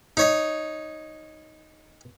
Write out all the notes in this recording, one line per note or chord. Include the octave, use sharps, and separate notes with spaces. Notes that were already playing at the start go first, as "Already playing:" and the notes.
D#4 C#5 D#5